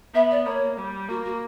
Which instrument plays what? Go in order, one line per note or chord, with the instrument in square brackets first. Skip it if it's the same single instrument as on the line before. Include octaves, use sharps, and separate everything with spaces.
[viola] B3 [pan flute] E5
[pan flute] D5
[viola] A#3 [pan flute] C#5
[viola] G3
[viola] A#3 [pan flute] F#4
[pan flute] F#4